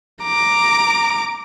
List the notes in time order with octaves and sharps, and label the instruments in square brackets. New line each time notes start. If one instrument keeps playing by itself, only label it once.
[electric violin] A#5 D6